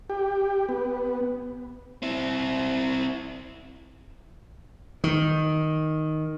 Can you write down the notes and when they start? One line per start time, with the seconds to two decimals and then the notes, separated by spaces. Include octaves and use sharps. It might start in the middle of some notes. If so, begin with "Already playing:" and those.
0.10 G4
0.69 B3
2.02 C4 E4
5.04 D#3